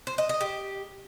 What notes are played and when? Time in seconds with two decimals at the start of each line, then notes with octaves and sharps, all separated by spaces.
0.07 C5
0.18 D#5
0.29 D#5
0.41 G4